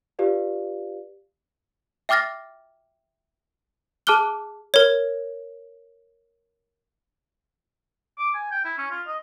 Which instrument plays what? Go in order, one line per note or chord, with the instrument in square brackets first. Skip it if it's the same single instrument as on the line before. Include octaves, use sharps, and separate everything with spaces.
[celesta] F4 G4 B4 D5 F5
[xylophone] E5 G5 D6 F6 A6 A#6
G#4 A5 D6 F6 F#6 G7
A#4 C#5
[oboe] D6
G#5
G5
E4
C#4
F4
D#5